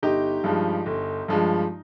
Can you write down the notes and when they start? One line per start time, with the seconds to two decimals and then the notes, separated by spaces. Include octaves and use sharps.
0.03 G1 D#4 G4
0.44 G2 F3 G#3
0.86 G1
1.28 G2 F3 G#3